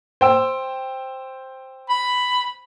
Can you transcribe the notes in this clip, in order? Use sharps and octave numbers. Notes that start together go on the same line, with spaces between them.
C5 G5 E6
B5